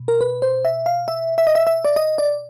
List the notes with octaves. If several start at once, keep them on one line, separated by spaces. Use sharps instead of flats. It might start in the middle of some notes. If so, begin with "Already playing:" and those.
Already playing: B2
A#4
B4
C5
E5
F5
E5
E5
D#5
E5
E5
D5
D#5
D5